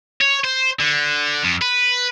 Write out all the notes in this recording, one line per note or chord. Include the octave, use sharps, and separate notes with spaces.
C#5
C5
D3
F2
B4